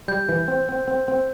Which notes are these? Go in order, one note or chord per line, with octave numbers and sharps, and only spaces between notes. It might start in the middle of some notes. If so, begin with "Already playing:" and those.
G3 G6
E3
C4
C4
C4
C4